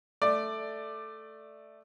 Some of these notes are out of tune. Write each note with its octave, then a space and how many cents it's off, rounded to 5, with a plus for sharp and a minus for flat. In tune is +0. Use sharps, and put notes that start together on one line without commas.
A3 +0 D5 +10